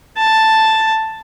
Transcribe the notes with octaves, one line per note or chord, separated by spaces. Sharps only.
A5